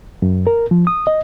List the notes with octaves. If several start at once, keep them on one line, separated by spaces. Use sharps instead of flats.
F#2
A#4
F3
D#6
D#5